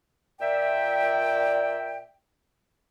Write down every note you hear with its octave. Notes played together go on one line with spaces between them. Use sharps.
A#2 D5 E5 G5